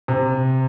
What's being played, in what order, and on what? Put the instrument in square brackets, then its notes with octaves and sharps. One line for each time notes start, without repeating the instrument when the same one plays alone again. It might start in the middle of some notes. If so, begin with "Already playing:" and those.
[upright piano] C3